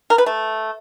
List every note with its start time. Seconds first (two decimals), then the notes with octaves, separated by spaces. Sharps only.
0.10 A#4
0.18 B4
0.26 A3